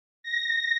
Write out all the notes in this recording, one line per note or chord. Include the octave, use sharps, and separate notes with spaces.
A#6